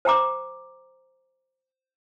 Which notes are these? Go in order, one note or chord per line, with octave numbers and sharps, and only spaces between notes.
C5 G5 A#5 D6